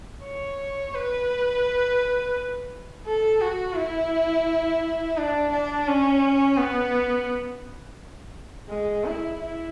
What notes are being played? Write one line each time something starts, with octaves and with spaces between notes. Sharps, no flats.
C#5
B4
A4
F#4
E4
D4
D4
C#4
B3
G#3
E4
E4